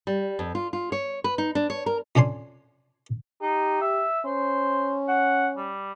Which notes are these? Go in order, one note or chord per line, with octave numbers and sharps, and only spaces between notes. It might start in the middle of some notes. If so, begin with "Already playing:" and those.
G3
F2
F4
F4
C#5
B4
D#4
D4
C#5
A#4
F2 C#4 D4 G#5 C6
D#4 G4
E5
C#4 C5
F#5
G3